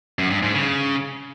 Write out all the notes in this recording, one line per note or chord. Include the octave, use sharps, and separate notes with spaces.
F#2
G2
G#2
C#3